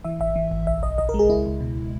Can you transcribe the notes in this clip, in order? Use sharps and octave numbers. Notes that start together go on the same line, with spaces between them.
E3 E5
G#1 E5
E3
G#1
B1 E5
B1 D#5
B1 D#5
A#4
G#3
G#4
C#2 E4
C#2
B2